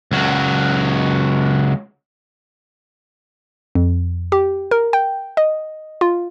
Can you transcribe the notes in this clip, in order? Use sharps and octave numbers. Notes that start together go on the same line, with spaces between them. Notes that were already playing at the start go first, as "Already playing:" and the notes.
C#2 F#3
F2
G4
A#4
G5
D#5
F4